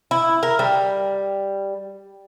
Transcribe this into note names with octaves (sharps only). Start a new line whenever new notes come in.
E4
A#4
G3